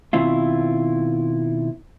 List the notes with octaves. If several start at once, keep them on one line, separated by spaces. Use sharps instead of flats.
B2 D#3 C4 E4 F4